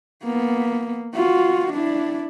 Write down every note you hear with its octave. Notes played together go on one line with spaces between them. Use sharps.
A#3 B3
F4 F#4
D4 E4